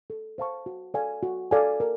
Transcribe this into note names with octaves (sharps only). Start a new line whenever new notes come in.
A4
C5 F5 A5 C#6
F#4
A4 D5 F5 G#5
F#4
A4 D5 F5 G#5
A#4